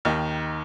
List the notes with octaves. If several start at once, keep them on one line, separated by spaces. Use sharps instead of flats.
D#2 D#3